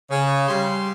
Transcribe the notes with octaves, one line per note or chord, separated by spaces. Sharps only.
C#3
G3 C6